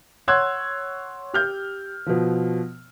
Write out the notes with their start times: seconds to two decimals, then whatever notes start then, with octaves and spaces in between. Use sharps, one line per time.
0.28 C#5 F#5 C6 E6 F#6 G#6
1.34 G4 F6 G6
2.06 B2 F3